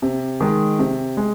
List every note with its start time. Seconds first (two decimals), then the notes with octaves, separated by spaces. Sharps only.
0.02 C3
0.41 D#3 G#3
0.79 C3
1.17 G#3